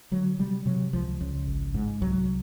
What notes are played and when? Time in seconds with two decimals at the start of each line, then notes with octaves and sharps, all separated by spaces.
0.11 D3 F#3
0.39 C3 G3
0.66 C3 F#3
0.93 C#2 F3
1.21 C#2
1.47 G#1
1.74 G#2
2.01 C2 F#3